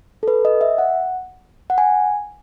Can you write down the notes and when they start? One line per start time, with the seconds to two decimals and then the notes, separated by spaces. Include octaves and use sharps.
0.23 A4
0.28 B4
0.45 D#5
0.61 E5
0.78 F#5
1.70 F#5
1.78 G#5